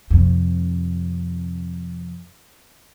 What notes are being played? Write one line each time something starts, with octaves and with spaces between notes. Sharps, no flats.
F2 C3